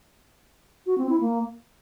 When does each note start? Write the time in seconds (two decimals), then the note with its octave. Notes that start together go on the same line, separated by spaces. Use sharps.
0.86 F#4
0.98 C4
1.09 E4
1.21 A#3